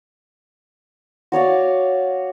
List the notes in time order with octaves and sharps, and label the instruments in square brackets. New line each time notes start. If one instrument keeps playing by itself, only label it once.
[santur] F#4 C#5 D5 F5